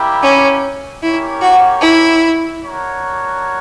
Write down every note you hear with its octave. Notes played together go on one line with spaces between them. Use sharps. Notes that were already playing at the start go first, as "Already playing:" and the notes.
Already playing: G3 A#3 E4 G4
C#4
A#3 C#4 E4 G4 C#5
F#4
E4
D4 F#4 A#4 C#5